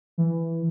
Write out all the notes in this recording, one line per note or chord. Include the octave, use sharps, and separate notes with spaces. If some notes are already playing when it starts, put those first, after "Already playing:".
E3